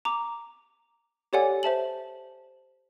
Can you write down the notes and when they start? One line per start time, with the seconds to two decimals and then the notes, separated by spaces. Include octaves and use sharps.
0.05 A#5 D6
1.33 G4 A4 C#5 D5 F#5 G#5
1.63 C5 E5 A5 F#7